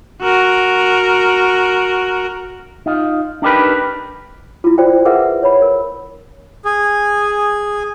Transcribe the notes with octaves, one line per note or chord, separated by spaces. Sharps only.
F#4 A#4
D#4 F4
D4 D#4 G4 A#4 B4
E4 F4
F4 F#4 C5 D5 G5
G#4 A#4 B4 E5 F#5
C#5 B5
A#4
G#4